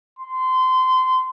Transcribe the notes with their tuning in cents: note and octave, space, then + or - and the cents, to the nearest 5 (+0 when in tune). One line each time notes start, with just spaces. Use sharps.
C6 -25